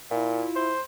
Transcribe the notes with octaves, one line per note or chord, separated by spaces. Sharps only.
A#2 E4 F4
C5